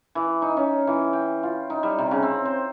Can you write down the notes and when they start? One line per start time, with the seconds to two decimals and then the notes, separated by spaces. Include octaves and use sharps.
0.15 E3
0.42 D#4
0.57 C#4
0.87 E3
1.13 G5
1.43 F4
1.70 D#4
1.83 G3
1.99 C3
2.11 C#3
2.23 C4
2.45 C5